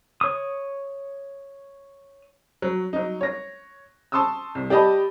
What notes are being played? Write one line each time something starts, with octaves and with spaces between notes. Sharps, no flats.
C#5 D#6
F#3
F#3 D#4
C#5 A#6
A5 C6 C#6 D#6 E6
C2
G4 D5 D#5 A5 B5